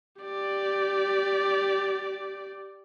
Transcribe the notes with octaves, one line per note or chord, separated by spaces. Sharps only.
G4 D5